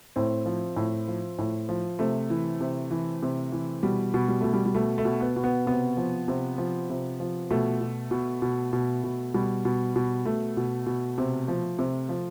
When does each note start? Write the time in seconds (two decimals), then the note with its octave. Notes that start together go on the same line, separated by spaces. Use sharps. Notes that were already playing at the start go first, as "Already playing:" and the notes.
0.16 A2 C4
0.46 F3
0.76 A2
1.08 F3
1.39 A2
1.69 F3
1.99 C3 A3
2.30 E3
2.61 C3
2.91 E3
3.22 C3
3.52 E3
3.83 B2 G3
4.14 B2
4.28 G3
4.41 B2 A3
4.54 G3
4.66 G3
4.75 B2 A3
4.98 A3
5.05 B2
5.21 B3
5.36 B2
5.44 B3
5.66 C3 B3
5.97 F3
6.28 C3
6.58 F3
6.90 C3
7.20 F3
7.51 B2 A3
7.81 B2
8.11 B2
8.42 B2
8.73 B2
9.04 B2
9.34 B2 G3
9.65 B2
9.96 B2
10.25 B2 A3
10.57 B2
10.86 B2
11.18 C3
11.48 F3
11.79 C3
12.09 F3